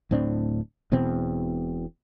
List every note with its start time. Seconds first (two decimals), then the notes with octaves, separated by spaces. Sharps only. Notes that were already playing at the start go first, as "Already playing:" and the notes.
0.11 D1 A2 C4 D4
0.92 E1 E2 B2 C4